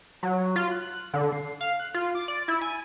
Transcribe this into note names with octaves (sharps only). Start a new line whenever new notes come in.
F#3
F4
F#6
D3
C7
F5
F#6
F4
D6
D5
E4
G#5